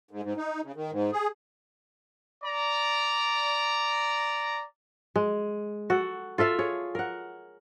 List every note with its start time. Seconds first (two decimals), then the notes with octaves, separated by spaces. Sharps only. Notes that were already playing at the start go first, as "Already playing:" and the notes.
0.11 G#2
0.23 G#2
0.37 D#4
0.64 C#3
0.76 D#3
0.91 G#2
1.13 G#4
2.44 D5 A#5
5.16 G#3
5.90 F#4 A4
6.38 F4 A4 E5 F5
6.59 G#4 C#5
6.95 A#4 F#5